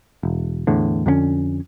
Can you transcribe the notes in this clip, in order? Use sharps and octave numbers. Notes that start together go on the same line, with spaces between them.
E1
E2 A2 D3
F2 D3 B3 C#4